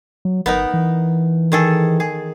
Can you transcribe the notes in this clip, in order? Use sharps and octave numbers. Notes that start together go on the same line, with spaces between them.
F#3
G1 B3 D#4 A#4
E3
D#3 G#4 A4
G#4